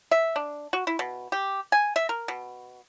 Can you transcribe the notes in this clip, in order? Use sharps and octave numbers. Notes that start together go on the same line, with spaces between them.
E5
D4
F#4
E4
B2
G4
G#5
E5
A#4
B2